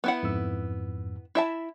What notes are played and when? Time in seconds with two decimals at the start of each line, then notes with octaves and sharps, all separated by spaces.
0.04 B3 E4 F#5
0.23 F2 G#2 E6
1.35 E4 E5 A5